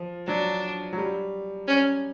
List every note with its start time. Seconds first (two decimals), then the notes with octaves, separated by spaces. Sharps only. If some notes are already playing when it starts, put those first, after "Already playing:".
Already playing: F3
0.27 F#3 D4
0.93 F#3
0.98 G3
1.68 C#4